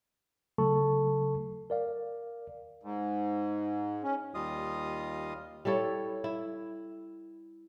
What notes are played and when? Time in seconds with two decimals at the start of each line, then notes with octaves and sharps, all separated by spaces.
0.58 C#3 F#3 A3 A4 A5 C#6
1.70 A#4 D5 F5
2.83 G#2
4.03 C#4
4.34 D#2 G3 F4 D#5 F5 D#6
5.65 G3 E4 A4 C#5
6.24 E4